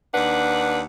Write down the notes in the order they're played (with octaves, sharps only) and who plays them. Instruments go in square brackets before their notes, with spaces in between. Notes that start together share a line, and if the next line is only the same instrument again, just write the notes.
[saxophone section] D#2 D4 B4 F#5